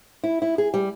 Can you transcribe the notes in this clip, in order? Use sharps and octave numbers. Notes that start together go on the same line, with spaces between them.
E4
E4
G#4
G3